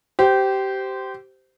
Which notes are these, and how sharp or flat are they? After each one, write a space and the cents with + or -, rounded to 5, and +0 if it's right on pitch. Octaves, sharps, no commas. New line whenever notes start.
G4 -20 C5 -15